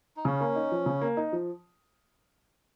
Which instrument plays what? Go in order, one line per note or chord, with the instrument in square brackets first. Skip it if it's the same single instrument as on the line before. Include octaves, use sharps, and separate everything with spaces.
[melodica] D#4
[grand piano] C#3 [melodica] C#4
[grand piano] A#3
D#4
F3
C#3
A#3
D#4
F3